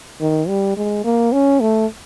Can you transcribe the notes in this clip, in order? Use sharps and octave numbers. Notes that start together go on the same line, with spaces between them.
D#3
G3
G#3
A#3
C#4
A3